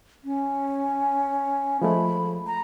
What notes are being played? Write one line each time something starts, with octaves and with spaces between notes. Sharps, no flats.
C#4
F3 G#3 A3 B5
A#5